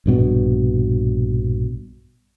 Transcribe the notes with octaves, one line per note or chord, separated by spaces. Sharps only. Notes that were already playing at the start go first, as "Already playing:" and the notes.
A#1 G2 B2